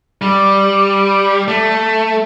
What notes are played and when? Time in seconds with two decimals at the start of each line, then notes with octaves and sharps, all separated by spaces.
0.22 G3
1.48 A3